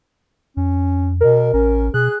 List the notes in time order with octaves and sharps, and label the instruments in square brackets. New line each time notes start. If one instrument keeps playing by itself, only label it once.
[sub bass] F2 [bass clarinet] C#4
[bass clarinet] B2 [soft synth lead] A#4
[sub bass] A1 [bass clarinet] C#4 [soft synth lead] A#4
[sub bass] B2 [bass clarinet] G#4 [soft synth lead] F#6